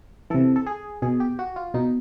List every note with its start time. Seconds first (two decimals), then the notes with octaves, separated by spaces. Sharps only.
0.30 C3 E3 A4
0.56 A4
0.67 G#4
1.02 B2 G#4
1.20 G4
1.39 F#4
1.56 F4
1.74 B2 D#4